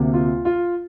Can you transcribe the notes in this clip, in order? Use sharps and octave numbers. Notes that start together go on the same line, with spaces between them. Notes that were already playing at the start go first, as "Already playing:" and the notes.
Already playing: D2 C3 A#3
F4
F4